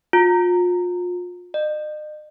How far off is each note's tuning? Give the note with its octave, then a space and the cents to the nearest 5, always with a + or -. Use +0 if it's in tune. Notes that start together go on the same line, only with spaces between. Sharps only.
F4 +30
D#5 -40